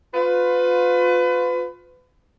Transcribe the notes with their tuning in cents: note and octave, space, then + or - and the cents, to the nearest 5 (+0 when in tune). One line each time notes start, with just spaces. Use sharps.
F4 +30 B4 +30